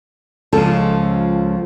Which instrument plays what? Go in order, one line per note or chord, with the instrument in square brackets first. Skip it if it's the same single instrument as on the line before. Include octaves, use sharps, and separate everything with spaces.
[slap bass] C#2 C#3 [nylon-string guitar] F3 A4